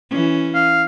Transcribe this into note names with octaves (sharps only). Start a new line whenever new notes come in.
E3 C#4
F5